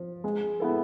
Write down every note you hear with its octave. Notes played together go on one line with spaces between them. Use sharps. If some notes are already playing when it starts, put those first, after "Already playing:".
Already playing: F3
G#3
B3 E4 A4